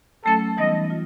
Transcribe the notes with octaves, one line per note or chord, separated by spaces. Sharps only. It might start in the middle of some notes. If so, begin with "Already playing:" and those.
F#3 A3 C#4 A4
E3 G3 B3 D#4 D#5
F4